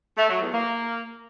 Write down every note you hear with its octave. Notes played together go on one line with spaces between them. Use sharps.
A3
F#3
E2
A#3